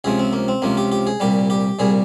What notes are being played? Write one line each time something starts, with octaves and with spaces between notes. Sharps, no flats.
C#2 C3 F3 G#4
C4
A#3
C4
C#2 C3 F3 A#3
G4
G4
G#4
C2 A#2 G3 G4
G4
C2 A#2 G3 G#4